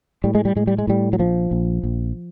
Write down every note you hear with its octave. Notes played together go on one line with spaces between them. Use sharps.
A2 G3
G#3
G3
A2 G#3
G3
G#3
A2 G3
F#3
A#1 F3
A#1
A#1